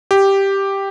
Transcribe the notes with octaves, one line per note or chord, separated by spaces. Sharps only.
G4